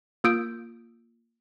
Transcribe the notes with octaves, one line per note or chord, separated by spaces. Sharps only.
A#3 F4 D#6 E6 G6 D7